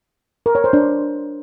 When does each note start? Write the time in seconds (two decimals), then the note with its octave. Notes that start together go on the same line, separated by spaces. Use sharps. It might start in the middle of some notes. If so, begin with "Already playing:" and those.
0.46 A#4
0.55 C#5
0.64 C5
0.73 D4